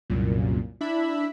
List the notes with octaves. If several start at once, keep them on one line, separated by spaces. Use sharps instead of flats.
C2 F#2 A#2
D4 E4 E5 B5